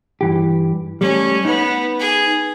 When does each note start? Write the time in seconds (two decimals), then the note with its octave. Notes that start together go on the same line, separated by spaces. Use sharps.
0.21 G2 E3 G4
1.01 G3 A3 C#4
1.45 B3 D#4 B4
1.99 G#4